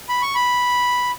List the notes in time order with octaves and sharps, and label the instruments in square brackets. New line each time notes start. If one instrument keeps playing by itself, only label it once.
[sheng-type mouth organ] B5
C#6
B5